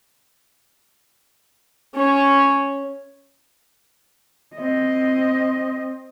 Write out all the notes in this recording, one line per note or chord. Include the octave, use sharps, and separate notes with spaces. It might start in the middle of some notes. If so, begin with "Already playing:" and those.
C#4 C#5
C4 D#5